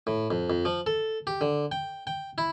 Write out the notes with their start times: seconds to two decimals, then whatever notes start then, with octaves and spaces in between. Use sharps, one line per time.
0.07 A2
0.31 F2
0.50 F2
0.65 F3
0.86 A4
1.27 G4
1.41 D3
1.72 G5
2.07 G5
2.38 E4